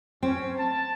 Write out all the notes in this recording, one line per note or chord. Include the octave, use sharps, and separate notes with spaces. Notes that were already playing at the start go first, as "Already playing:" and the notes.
C4 C#4
A5